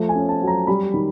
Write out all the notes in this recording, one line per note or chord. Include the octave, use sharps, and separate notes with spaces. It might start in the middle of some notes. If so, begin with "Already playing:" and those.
Already playing: F3 A3
G#5
C#4
A5
F#3
A#5
G3 B5
D#3